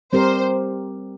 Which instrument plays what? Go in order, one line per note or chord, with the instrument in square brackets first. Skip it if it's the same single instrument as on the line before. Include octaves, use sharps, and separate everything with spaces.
[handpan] G3 C4 G4 A#4 [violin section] C5